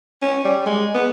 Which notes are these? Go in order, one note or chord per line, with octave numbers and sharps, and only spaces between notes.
C#4
G3
G#3
B3